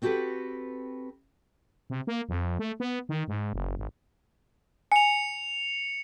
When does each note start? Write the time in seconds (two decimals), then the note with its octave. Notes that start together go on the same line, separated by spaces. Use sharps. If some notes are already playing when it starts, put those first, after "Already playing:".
0.02 B3 C4 F#4 G4 A4 B4
1.90 C3
2.07 A#3
2.29 F2
2.59 A3
2.80 B3
3.09 D#3
3.28 G#2
3.53 F#1
3.77 G#1
4.92 G#5 C#7 F7